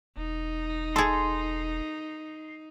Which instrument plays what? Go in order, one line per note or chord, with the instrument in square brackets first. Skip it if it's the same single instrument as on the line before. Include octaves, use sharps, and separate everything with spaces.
[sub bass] E1 [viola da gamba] D#4
[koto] G#4 A4 [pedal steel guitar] C6